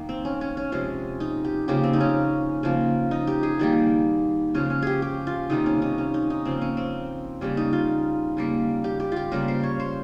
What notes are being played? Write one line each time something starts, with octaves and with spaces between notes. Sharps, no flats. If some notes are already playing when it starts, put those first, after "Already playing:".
Already playing: D#3 A#3
C4
C#4
C#4
C#4
C3 F3 G#3 C#4
D#4
G4
C#3 F3 A#3 G4
C4
D#4
C#4
C#3 F3 A#3
D#4
G4
G#4
D#3 G3 A#3
C#3 F3 G#3 C#4
C#4
G4 G#4
G4
F4
C3 D#3 G3 A#3 D#4
C#4
D#4
C#4
D#4
D#4
C#3 F3 A#3 C4
C#4
C4
C#3 G3 A#3 C#4
D#4
F4
C#3 G3 A#3
G4
G4
F4 G4
C#3 G3 A#3 A#4
C5
C#5
C5